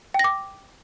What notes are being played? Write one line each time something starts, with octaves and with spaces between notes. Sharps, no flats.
G5 D6 A#6